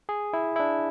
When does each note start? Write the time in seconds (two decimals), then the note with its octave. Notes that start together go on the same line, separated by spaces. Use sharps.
0.09 G#4
0.33 E4
0.56 E4
0.60 D4